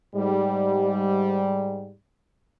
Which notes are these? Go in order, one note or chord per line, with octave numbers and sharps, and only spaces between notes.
G#2 G3